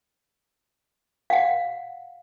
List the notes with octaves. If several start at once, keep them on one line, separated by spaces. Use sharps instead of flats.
F5 F#5